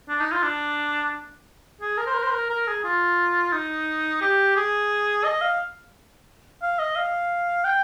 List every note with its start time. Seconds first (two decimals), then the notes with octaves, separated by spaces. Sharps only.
0.09 D4
0.20 D#4
0.32 F4
0.43 D4
1.81 G#4
1.97 A#4
2.06 C5
2.14 A#4
2.23 C5
2.31 A#4
2.49 A#4
2.67 G#4
2.84 F4
3.52 D#4
4.21 G4
4.56 G#4
5.24 D#5
5.42 F5
6.62 F5
6.79 D#5
6.96 F5
7.64 G5